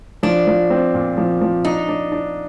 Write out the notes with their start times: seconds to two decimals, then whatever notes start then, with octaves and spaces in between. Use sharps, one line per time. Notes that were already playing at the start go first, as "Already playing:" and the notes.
0.23 F3 D4
0.47 F3
0.70 C4
0.94 A#2
1.18 F3
1.41 F3
1.65 D4 D#4
1.89 D4
2.12 D4